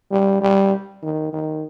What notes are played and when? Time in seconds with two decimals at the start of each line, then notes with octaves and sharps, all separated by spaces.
0.11 G3
0.41 G3
1.03 D#3
1.33 D#3